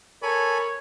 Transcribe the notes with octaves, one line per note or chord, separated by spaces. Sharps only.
A4 A#4 C#5 G#5 B5